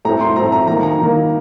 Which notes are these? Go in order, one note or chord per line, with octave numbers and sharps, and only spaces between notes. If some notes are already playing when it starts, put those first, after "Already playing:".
A2 A3 C4 A#5
C6
A2 A3 C4 A#5
A#5
D#3 A#3 A#5
A#5
D#3 A#3